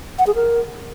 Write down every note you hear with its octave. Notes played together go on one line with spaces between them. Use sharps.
F#5
G#4
A#4